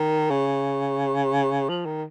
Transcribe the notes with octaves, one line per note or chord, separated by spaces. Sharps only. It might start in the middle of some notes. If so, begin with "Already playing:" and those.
Already playing: D#3
C#3
F3
D#3